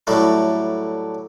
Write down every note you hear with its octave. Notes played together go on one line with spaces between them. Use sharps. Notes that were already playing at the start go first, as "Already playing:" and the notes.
A2 F#3 G3 A3